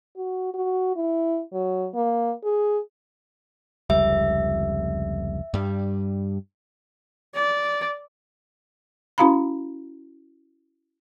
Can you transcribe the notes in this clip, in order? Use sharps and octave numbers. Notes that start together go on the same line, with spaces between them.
F#4
F#4
E4
F#3
A#3
G#4
F1 C#2 G3 E5
G2 G3
D5
C#4 E4 F#4 F5 A#5 B5